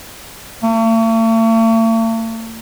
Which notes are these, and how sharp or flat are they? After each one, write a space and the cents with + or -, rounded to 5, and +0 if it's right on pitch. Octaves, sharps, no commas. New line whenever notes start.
A3 +45